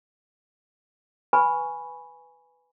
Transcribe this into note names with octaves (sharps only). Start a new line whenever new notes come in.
B4 G#5 B5 C#6